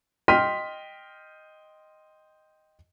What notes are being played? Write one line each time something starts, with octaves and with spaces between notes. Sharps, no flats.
D#5 G5 C6 F6 B6 D#7